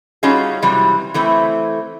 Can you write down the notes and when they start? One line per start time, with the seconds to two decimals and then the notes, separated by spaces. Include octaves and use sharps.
0.23 G3 C#4 D#4 F4 F#4 G#4
0.62 C3 E3 F#3 G3
1.14 E3 A3 C4 E4